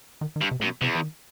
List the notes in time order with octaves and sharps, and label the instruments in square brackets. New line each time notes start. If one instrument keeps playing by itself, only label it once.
[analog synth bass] D#3
D#3
[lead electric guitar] G2
[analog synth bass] C3
[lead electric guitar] F#2 [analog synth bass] A2
[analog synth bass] B2
[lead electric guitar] E2 [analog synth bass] C3
[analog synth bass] E3
D#3